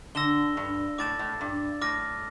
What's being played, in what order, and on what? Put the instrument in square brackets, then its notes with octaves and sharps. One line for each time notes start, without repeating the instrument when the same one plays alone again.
[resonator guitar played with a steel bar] D3 [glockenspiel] E6 A#6 E7 G7
[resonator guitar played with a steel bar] G2
[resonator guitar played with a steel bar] A2 [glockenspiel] D6 A6 E7
[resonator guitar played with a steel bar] A2
G2
[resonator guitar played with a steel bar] A2 [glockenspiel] D6 F6 A#6